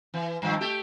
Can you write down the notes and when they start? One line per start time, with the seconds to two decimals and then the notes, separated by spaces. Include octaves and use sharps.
0.14 E3
0.42 G2 D#3 F3
0.61 A3 G4 A4